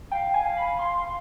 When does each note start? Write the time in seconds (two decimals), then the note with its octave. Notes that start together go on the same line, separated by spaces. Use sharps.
0.11 F5 G5
0.34 G#5
0.57 B5
0.79 C6